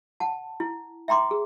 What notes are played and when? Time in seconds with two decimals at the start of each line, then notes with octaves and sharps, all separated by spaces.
0.20 F#5 A5
0.60 E4
1.08 E5 G5 A#5 C6 D6
1.31 G#4